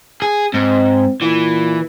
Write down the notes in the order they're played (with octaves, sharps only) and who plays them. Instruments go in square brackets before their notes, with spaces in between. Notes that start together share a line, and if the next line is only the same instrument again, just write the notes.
[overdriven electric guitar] G#4
[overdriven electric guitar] G#2 [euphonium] C4
[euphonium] A#2 [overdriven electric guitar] E3